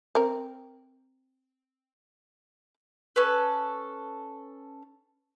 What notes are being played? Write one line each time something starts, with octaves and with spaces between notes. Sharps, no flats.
C4 A#4
C#4 A4 B4